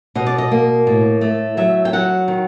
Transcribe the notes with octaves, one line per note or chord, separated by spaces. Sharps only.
B2 D#5
D5
D#5
A#3
A2
A3
F#3 E5
G5
F#3 F#5
D#3